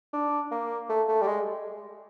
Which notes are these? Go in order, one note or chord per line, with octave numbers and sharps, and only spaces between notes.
D4
A#3
A3
A3
G3
G#3